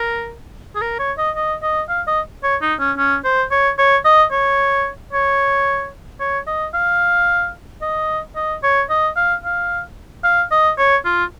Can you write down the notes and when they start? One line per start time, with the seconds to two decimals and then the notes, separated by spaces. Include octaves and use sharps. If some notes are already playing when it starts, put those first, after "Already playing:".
Already playing: A#4
0.75 G#4
0.82 A#4
0.99 C#5
1.18 D#5
1.36 D#5
1.62 D#5
1.89 F5
2.07 D#5
2.43 C#5
2.62 D#4
2.79 C#4
2.97 C#4
3.24 C5
3.51 C#5
3.78 C#5
4.05 D#5
4.32 C#5
5.13 C#5
6.20 C#5
6.47 D#5
6.74 F5
7.82 D#5
8.36 D#5
8.63 C#5
8.90 D#5
9.16 F5
9.44 F5
10.24 F5
10.51 D#5
10.78 C#5
11.05 F4